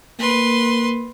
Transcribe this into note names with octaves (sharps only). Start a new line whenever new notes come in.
A#3 B4 C6